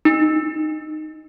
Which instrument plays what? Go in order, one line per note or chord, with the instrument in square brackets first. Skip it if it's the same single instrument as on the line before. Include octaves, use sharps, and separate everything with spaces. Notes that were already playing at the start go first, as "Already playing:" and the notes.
[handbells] D#4